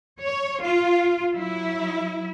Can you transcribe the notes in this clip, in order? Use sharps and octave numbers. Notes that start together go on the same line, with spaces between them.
C#5
F4
F#3 E4